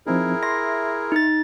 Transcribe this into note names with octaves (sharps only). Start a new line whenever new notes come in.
F3 C4 D#4 E4 G#4 A#4
E5 C6 A#6
D#4 A6